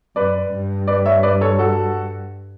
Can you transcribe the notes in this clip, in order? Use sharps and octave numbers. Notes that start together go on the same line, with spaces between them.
F#2 B4 D5
G2
B4 D5
C#5 E5
B4 D5
A4 C#5
F#4 A4